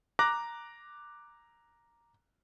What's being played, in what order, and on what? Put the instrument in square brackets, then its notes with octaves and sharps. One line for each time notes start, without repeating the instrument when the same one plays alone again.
[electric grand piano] A#5 D6 F#6 A#6